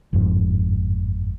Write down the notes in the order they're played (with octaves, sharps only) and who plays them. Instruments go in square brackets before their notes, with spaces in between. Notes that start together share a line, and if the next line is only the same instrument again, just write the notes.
[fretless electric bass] G1 F2 G#2 F3